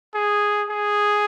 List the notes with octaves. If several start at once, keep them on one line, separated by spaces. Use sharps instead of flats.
G#4
G#4